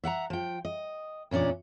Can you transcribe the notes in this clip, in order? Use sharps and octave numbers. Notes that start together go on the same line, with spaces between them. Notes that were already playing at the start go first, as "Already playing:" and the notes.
E5 F#5 G5 A#5
F3 G5
D#5
E2 A#2 C#4 D4 D5